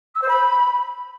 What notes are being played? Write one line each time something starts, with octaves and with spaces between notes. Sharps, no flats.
E6
C5
B5